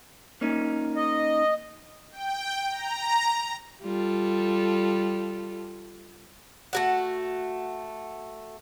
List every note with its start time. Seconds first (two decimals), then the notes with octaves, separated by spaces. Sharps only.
0.41 A#3 C#4 D#4
0.96 D#5
2.12 G5
2.70 A#5
3.82 G3 F4 A4
6.73 A3 F#4 F#5